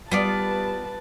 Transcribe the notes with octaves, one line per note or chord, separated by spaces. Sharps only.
G3 B3 F4 B4 D5 A5